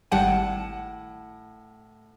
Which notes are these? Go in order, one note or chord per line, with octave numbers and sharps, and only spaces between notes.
G#1 A2 G3 F#5 G5 A5